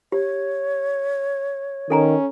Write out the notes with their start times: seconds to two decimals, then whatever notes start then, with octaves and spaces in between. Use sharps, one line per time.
0.12 G4 C#5
1.90 D#3 C#4 A4 G#5 A#5